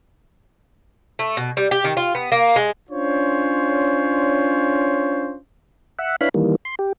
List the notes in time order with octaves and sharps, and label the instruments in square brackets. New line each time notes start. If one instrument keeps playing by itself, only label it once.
[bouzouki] A3
B2
G3
G4
D#3
F4
B3
A#3
G#3
[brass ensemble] C#4 D4 F4 C5 C#5
[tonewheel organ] E5 F#5
D4 E4 B4 C#5 F5 B5
D#3 E3 G3 A#3
C6
G4